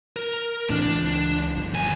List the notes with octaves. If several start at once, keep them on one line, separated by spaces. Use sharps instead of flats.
A#4
A2 E3 C4 D4
C#2 E3
G1 F3
D#2 G#5